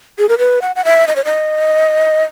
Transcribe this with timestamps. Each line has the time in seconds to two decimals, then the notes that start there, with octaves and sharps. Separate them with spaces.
0.19 G#4
0.29 A#4
0.38 B4
0.62 F#5
0.76 F#5
0.85 E5
1.08 D#5
1.16 C#5
1.25 D#5